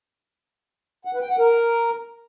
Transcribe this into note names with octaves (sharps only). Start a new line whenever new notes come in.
F#5
B4
G5
F#5
A#4